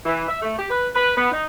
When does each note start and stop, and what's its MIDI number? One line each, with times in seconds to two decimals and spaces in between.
0.06 0.28 52
0.28 0.41 76
0.42 0.55 57
0.58 0.68 67
0.69 0.87 71
0.94 1.14 71
1.15 1.30 59
1.31 1.45 63